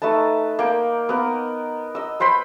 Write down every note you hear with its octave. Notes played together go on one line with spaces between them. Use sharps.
A3 D#4 B4 A5
A#3 G5
B3 A#4
D#5 E6
B4 C5 G5 B5